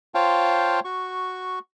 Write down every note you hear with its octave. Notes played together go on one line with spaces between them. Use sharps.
F4 C5 C#5 F5 G5 A5
F#4 C#6